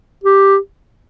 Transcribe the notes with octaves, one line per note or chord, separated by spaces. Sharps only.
G4